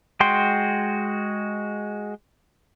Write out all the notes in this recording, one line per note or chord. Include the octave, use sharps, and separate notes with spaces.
G#3 F#4 G5 C6